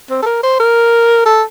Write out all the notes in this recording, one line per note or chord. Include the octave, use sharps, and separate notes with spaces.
C4
A4
A#4
C5
A#4
A4